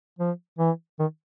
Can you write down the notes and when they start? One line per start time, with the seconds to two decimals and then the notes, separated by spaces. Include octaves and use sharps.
0.19 F3
0.59 E3
1.00 D#3